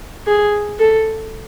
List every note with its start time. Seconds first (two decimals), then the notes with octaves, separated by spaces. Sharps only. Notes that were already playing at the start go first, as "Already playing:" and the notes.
0.27 G#4
0.79 A4